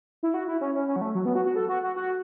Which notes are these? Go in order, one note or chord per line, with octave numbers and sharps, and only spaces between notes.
E4
F#4
E4
C#4
C#4
C#4
F#3
A3
F#3
B3
F#4
F#4
A4
F#4
F#4
F#4